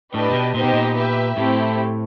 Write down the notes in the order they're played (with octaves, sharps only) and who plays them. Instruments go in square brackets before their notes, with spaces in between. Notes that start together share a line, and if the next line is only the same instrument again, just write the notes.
[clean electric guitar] A2 [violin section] D4 G4 B4 D#5
[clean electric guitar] A#2
B2
[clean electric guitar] A#2 [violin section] B3 D#4 G4 C5 D#5
[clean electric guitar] B2
A#2
[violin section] G4 B4 E5
[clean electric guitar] A2 [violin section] A3 C4 E4 G4